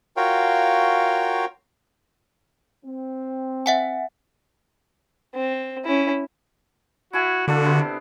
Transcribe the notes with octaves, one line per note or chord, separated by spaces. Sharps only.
F4 F#4 A#4 C#5 F5 G5
C4
E5 F#5 G#5
C4
C#4 E4
E4 F#4 G#5
D3 A#3 D4 F#4 A4
C3 B3 C5